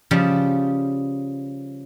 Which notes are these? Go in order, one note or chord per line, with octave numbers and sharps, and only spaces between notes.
C#3 F3 G3